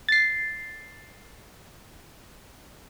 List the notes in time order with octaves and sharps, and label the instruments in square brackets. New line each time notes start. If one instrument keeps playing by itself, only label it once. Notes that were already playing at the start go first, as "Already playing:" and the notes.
[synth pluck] A6 C7